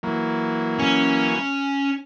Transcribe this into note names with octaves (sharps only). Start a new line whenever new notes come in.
E3 F#3 A#3
C#4